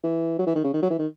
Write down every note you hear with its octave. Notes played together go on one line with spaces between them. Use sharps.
E3
F#3
E3
D#3
C#3
D#3
F#3
E3
D#3